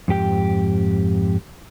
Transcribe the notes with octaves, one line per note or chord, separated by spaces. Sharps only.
F2 G#2 G4 G5